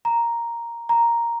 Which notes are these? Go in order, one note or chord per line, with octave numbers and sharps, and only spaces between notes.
A#5
A#5